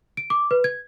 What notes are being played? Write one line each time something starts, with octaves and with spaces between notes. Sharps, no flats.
D7
D6
B4
G#6